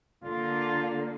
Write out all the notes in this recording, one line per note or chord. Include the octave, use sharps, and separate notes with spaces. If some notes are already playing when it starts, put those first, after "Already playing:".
D3 A#3 F4